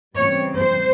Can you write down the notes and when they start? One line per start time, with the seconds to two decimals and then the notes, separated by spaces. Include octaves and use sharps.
0.15 C#3 E3 G3 C4 C#5
0.57 C5